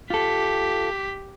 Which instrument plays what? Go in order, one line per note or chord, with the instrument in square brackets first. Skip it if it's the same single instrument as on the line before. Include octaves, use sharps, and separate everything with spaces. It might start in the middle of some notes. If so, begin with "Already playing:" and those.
[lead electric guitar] F4 A4 [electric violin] G4 B6